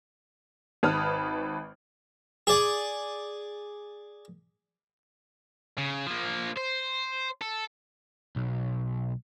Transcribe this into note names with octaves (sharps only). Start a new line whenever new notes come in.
G#1 B4 A5 B5 D#6 F6
G#4 D5
C#3
F3 A#3
C5
A4
B1